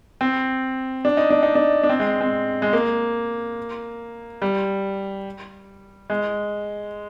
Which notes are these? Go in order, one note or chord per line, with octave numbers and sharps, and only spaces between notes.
C4
D4
D#4
D4
D#4
D4
D4
C4
G#3
C4
G#3
A#3
G3
G#3